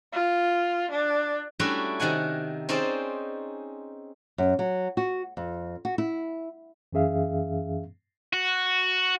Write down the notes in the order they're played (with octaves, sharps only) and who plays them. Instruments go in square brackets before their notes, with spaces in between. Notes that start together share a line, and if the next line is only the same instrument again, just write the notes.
[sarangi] F4
D4
[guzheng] G3 A3 C#4 D4 E4 F#4
C3 D#3 A#4 F#5 G#5
C4 C#4 D#4 G#4 C5 D5
[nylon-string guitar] F#2
F#3
F#4
F2
F#4
E4
[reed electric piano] F#2 E3 C#4 G#4 E5 F5
[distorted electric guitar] F#4